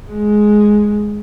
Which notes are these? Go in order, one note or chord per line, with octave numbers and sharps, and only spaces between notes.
G#3